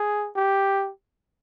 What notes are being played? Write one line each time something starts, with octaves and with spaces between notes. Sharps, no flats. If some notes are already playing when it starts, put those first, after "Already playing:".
Already playing: G#4
G4